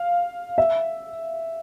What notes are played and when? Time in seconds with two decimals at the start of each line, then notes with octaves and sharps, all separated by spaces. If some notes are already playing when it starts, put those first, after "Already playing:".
Already playing: F5
0.58 E5